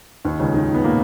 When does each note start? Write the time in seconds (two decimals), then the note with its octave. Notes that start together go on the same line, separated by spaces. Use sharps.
0.25 D#2 D#3
0.40 C#2 C#3
0.54 D#2 D#3
0.74 B3
0.84 A#2 A#3